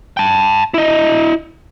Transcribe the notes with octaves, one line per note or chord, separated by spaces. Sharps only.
G5 A5
E4 D#5